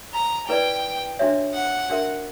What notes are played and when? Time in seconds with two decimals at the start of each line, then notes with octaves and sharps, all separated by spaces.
0.14 A#5
0.48 E4 B4 D5 G5
1.19 D4 F#4 C#5 E5
1.54 F#5
1.89 D4 F#4 A#4 E5